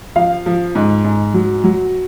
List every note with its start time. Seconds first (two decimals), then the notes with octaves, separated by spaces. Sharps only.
0.16 F3 F5
0.46 F3
0.75 G#2
1.04 G#2
1.34 F#3
1.64 F#3